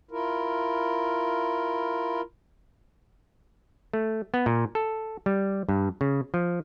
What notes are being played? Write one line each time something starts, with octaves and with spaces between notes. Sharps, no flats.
E4 F4 A#4
A3
B3
A#2
A4
G3
G2
C#3
F3